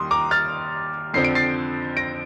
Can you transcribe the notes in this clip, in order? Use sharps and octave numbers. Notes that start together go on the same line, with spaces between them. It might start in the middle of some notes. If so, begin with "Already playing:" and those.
Already playing: D#2 D#3 G3 C6 D#6
A#5 D6
F6 A6
F2 D3 F3 C4 C7
D7
A6 C7
A#6 D7